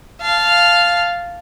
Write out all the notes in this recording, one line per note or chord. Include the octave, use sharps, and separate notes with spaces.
F5 A5